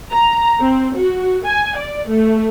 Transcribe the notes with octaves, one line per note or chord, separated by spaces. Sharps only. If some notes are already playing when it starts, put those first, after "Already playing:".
A#5
C4
F#4
G#5
D5
A3